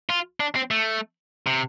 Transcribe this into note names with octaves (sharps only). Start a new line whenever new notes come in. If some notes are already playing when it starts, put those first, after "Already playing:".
F4
D4
C4
A3
C3